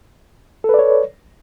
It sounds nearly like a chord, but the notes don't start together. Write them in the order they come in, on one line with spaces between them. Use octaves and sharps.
A4 B4 D5 C#5